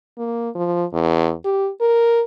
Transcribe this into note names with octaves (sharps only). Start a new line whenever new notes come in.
A#3
F3
E2
G4
A#4